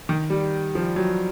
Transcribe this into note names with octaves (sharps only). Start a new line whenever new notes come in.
D#3
G3
F3
F#3